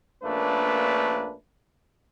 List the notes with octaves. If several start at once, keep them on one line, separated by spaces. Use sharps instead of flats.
A#1 A3 A#3 C#4 D4 B4